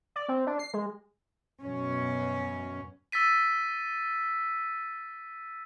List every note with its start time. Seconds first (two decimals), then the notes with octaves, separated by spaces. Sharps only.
0.16 D5
0.29 C4
0.47 D4
0.59 C7
0.74 G#3
1.61 F#2 B2 F#3 C#4
3.12 E6 A6 B6 D#7